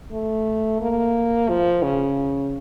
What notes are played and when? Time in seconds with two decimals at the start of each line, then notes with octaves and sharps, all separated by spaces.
0.12 A3
0.81 A#3
1.49 F3
1.83 C#3